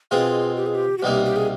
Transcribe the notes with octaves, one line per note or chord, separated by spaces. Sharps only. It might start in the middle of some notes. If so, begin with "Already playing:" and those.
B2 G#3 C4 F4 G#4
G4
G#4
G4
F#4
C2 B2 G3 A#3 D#4 G4
G4
G#4